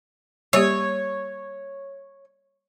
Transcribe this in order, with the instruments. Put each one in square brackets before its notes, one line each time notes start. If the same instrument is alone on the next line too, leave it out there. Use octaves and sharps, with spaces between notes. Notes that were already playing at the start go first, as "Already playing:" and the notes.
[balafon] G3 A#3 G4 [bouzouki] C#5